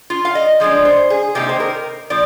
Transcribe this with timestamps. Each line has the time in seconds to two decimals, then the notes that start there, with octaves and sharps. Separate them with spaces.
0.10 F4
0.25 F5
0.35 D#5
0.60 F3 G#3 D4
0.85 C5
1.10 G#4
1.35 C3 D#3 A#3 D#4 G4
1.49 C5
1.60 A#4
2.10 A#2 F3 D5